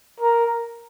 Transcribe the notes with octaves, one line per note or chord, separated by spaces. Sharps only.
A#4